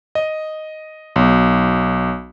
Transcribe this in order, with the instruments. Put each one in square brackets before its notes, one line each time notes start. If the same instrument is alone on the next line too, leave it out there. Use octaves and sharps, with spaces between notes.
[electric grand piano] D#5
B1